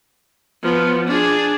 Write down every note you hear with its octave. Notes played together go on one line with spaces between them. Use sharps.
F3 B3
D4 G#4